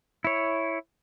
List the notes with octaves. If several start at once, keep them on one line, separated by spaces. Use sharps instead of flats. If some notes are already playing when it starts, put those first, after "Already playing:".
E4 C#5